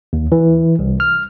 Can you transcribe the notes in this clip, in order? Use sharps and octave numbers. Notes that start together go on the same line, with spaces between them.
D#2
E3
C2
F6